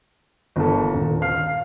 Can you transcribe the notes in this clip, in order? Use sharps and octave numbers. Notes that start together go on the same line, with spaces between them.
G1 A#3 A4
D#1
F5 F6 C7